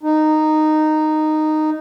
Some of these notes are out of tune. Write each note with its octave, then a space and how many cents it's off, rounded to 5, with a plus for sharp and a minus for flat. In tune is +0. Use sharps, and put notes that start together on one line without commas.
D#4 -10